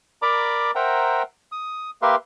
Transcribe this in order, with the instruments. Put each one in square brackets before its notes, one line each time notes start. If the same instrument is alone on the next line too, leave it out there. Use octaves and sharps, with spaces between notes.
[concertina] A#4 D5 A#5 B5 D6
A#4 C5 E5 F#5 G5 A#5
D#6
A#3 G4 A#4 B4 E5 C6